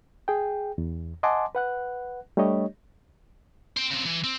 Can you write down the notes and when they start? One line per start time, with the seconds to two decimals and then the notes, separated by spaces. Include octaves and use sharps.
0.28 G#4 G5
0.78 E2
1.23 D#5 F#5 G#5 A5 C6 D6
1.55 B4 F#5 F#6
2.37 G3 A3 D4 G4 C#5 D#5
3.77 C5 G5
3.91 C#3 C4
4.06 E3
4.24 C4